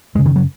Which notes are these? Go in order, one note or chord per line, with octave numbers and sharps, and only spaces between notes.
F#2 C#3 G#3
D#3
F#3